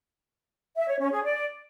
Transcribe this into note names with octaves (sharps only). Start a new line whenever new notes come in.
E5
C#5
C#4
G#4
D5